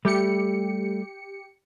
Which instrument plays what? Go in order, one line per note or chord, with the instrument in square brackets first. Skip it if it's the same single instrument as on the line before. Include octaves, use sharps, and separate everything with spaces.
[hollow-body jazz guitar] G3 A3 [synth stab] G4 C#7